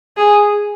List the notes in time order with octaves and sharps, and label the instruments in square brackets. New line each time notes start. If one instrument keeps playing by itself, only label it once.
[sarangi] G#4